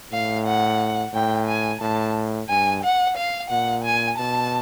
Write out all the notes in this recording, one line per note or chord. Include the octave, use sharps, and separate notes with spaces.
A2 F5
F#5
A2 G5
G#5
A2 A5
G2 G#5
F#5
F5
A#2 F#5
G#5
B2 A5